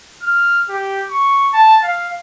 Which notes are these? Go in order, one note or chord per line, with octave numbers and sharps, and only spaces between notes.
F6
G4
C#6
A5
F5